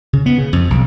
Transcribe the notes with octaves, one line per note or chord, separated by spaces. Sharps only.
C#3
B3
C#3
F2
B1